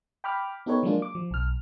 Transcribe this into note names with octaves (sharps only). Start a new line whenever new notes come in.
G5 B5 D6 F6
B3 D#4 G4 A4 B4 C#5
F3 F#3 G#3 A#3 D4 F4
D6
F3
B1 F6